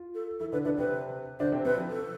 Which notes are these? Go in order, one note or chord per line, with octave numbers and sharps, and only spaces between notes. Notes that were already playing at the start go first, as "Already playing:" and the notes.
Already playing: F4
A4
E3 E4 A4
D3 D4 B4
D3 D4 B4
C3 C4 B4
D3 D4 C5
C3 C4
C3 C4 B4
F3 F4
A4